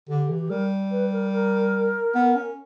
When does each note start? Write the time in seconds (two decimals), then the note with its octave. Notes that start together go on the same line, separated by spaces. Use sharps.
0.09 D3 G4
0.30 E3
0.39 G4
0.50 G3 A#4
0.91 B4
1.12 A#4
1.32 A#4
2.15 B3
2.36 C#4